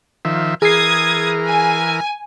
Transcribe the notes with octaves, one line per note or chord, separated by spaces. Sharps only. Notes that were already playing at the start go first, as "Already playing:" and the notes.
D#3 F3 E5
E3 G#4 A#4 D#6 G#6 C7
G#5